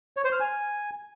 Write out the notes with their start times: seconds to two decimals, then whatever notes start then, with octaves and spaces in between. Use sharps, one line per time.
0.17 C#5
0.25 C5
0.32 F6
0.40 G#5